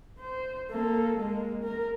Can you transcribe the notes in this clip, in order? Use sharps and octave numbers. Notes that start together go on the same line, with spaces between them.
C5
A#3 A4
G#3 A#3
A#4